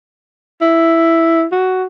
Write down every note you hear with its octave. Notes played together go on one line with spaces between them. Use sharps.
E4
F#4